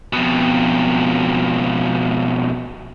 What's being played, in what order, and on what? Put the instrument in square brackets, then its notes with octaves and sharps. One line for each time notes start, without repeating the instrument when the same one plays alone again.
[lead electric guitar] F2 B2